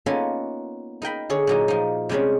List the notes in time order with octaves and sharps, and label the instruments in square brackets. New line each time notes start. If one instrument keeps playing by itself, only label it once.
[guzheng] A#3 B3 C#4 D#4 F4 A4
D#4 A#4 G5 B5
D3 G#4 C#5
A#2 F#3 D#4
F3 D#4
C3 G3 G#3 C4 C#4